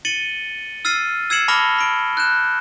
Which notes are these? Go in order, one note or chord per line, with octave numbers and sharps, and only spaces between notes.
A6 C#7 D#7 F#7 G7
E6 F6 A6 C7 D#7
E6 G#6 C7 C#7 E7 F#7
A5 B5 D6 F6 A#6 G7
B5 D7
F#6 G6 E7